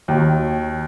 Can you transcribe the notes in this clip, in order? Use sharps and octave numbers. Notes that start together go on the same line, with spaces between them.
D#2 D#3 F#3